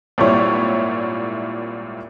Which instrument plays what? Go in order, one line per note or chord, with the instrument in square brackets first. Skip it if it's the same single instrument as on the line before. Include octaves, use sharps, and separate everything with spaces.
[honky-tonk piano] G#1 A#2 G3 E4 C#5